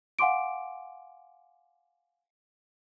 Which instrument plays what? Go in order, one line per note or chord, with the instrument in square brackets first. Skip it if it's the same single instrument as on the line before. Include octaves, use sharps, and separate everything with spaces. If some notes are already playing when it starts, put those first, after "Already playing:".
[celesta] F5 F#5 G#5 C6 D6 D7